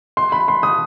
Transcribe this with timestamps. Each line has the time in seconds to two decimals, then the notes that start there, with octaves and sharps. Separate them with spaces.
0.17 C6
0.32 B5
0.48 C6
0.63 D#6